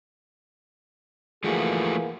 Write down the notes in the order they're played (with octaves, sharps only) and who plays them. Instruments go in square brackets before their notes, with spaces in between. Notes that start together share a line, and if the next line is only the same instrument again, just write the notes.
[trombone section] E3 A#3 G#4 [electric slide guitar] F3 A3 F#4